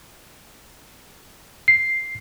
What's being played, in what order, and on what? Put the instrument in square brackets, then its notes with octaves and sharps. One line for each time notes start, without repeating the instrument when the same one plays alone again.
[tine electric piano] C7